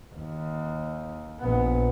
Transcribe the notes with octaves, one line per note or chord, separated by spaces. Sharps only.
D#2
A#1 B3